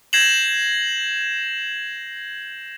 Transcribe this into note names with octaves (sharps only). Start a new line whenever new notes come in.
G6 G#6 A#6 C7 E7 F#7